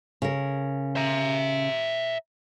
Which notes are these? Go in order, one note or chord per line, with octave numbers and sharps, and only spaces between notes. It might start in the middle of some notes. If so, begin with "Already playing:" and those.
C#3 A#4
E5 A#5